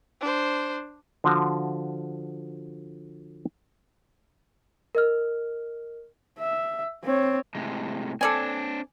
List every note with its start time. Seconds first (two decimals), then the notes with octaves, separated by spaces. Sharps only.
0.21 D4 C5
1.24 D3 F3 F#4
4.95 A#4 D#5 F6
6.39 E5
7.04 C4 C#5
7.55 A2 C3 G#3
8.21 C4 D4 A4 D5 G#5